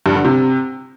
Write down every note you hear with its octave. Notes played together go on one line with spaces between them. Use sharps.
G2
D3
C3